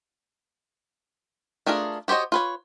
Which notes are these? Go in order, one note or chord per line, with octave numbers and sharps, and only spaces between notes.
A3 D4 F4 G#4 A#4
F#4 G4 C5 C#5 D#5
F4 B4 C#5